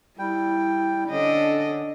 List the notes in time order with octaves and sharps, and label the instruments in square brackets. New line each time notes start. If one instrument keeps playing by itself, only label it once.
[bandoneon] G3 G5 [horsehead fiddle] E4
[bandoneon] D3 [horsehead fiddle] C#4 A4 [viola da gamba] D4 D#5